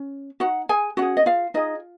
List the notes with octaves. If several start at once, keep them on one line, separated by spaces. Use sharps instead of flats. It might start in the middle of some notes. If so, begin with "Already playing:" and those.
Already playing: C#4
D#4 F#4 F#5
G#4 G#5
C#4 F#4 G#4 F#5
D#5
F4 F5
D#4 F4 G#4 D#5